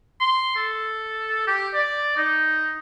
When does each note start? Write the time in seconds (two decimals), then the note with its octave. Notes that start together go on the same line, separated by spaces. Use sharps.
0.21 C6
0.56 A4
1.47 G4
1.74 D5
2.17 D#4